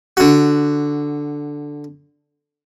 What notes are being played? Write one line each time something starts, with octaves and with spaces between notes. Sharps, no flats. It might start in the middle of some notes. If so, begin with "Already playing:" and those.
D3 F#4